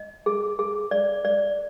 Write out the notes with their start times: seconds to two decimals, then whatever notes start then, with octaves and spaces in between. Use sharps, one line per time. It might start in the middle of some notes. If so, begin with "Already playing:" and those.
Already playing: D#5
0.26 G#4
0.59 G#4
0.91 D5
1.25 D5